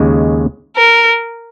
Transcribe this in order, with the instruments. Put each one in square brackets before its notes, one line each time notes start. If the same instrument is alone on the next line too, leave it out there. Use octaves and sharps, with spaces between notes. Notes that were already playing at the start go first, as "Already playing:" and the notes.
Already playing: [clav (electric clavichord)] D#2 C#3 G#3
[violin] A#4